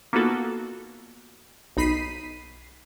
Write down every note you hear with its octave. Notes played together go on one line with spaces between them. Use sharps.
A#3 B3 D#4 F4 F#4 A4
B1 D#4 B5 B6 C7 D#7